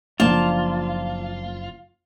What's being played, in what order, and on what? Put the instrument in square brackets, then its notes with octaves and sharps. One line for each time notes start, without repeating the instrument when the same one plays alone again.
[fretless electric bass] F#1 F3 D4 [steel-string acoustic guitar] A#3 A5 [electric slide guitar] F4